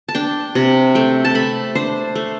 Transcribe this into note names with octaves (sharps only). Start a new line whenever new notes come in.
A5
D4 G5
C3
A3 G5
A5
A3 B5
D4 C5
A3